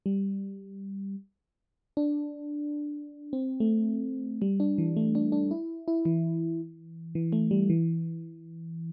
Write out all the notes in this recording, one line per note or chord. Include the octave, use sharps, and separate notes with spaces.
G3
D4
C4
A3
G3
D4
E3
A3
D4
D4
E4
E4
E3
E3
A3
G3
E3